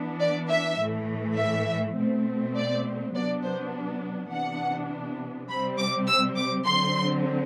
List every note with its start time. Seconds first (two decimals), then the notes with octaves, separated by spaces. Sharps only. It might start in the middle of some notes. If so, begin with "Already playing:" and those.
Already playing: E3 B3 D4
0.20 D5
0.49 E5
0.79 A2 E3 A3
1.38 E5
1.96 B2 A3 C4
2.56 D5
3.13 C3 F#3 B3 D4 D5
3.44 C5
4.31 C3 E3 B3 D4 F#5
5.49 C3 G3 C4 B5
5.79 D6
6.07 E6
6.36 D6
6.66 D3 F#3 C4 C6